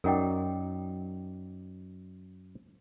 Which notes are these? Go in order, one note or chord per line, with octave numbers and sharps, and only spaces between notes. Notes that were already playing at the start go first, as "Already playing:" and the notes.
F#2 D#4 A#4 D5 F#5 G5